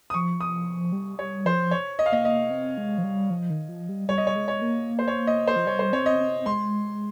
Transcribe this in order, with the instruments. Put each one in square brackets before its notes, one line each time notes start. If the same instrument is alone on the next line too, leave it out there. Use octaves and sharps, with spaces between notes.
[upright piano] D#6
[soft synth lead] F3 [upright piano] C#6
[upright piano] D#6
[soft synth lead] G3
[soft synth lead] G3 [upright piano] C#5
[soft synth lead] F3 [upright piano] C5
[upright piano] C#5
D#5
F5
[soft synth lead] A#3 [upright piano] D#5
[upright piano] D#5
[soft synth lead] C4
G#3
F3
G3
F3
D#3
F3
G3
[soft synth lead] G3 [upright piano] C#5
[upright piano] D#5
C#5
[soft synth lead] G#3
[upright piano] C#5
[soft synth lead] A#3
[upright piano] C5
C#5
D#5
C5
[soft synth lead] F3
[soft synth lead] G3 [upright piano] C#5
[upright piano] C5
[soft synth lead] C4 [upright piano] C#5
[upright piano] D#5
[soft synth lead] C4
[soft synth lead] G#3 [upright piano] C6